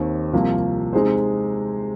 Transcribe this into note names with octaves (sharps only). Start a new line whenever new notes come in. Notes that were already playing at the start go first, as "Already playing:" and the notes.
Already playing: D#2 D#3 C4
C2 C3 F3 A#3 F4
C3 G#3 D#4 G#4 C5